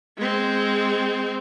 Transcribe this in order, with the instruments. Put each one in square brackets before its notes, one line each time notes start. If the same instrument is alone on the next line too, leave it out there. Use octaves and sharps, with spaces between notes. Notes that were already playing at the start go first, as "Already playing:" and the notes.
[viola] G#3 C4